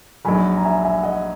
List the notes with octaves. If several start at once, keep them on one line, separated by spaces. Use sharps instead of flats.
A#1 G#2 F#3 G#5 B5
A#5
E5 G#5
E5 G#5
D#5 F#5